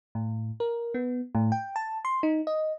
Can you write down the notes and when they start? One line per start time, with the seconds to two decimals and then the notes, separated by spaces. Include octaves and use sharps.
0.15 A2
0.60 A#4
0.94 B3
1.35 A2
1.52 G5
1.76 A5
2.05 C6
2.23 D#4
2.47 D#5